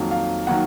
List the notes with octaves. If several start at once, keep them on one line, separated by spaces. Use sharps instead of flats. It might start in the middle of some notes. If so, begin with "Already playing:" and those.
Already playing: F2 D#3 F#3 A#3
F5
D#3 F#3 A#3 F#5